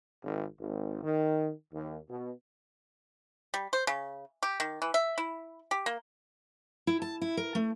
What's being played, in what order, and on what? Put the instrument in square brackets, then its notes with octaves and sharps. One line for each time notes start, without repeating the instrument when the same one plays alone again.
[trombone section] G#1
G#1
D#3
D#2
B2
[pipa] G3
C5
C#3
G4
D#3
E3
E5
E4
G4
A#3
[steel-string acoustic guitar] E4
A5
E4
A#4
A3